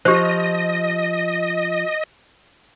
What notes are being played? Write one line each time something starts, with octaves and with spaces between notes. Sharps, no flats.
F3 G4 C5 D#5